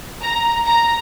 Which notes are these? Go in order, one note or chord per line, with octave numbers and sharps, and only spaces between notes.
A#5
A#5